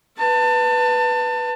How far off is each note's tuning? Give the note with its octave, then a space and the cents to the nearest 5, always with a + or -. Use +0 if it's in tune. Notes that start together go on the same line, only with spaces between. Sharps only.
B4 +0 A5 +30